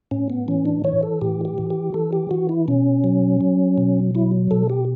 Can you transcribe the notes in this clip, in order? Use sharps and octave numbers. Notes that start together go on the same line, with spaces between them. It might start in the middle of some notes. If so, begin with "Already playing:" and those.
A2 C#4
B3
E3 C#4
D4
E3 C#5
A4
A2 G4
G4
E3
G4
E3 A4
G4
E3 F#4
E4
B2 C#4
F#3
F#3
B2
F#3 E4
B2 A4
G4